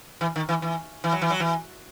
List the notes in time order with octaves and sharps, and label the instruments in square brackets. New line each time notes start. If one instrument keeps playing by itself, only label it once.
[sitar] E3
D#3
E3
E3
E3
F#3
E3
F#3
E3